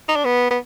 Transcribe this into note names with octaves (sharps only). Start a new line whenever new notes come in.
D#4
D4
B3
B3